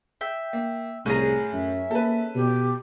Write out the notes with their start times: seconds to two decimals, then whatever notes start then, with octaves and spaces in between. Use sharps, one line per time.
0.21 E5 G5
0.53 A#3
1.06 C2 A2 C#4 G#4 A#5
1.53 F#2 E5
1.91 A#3 A4 B4
2.35 B2 G4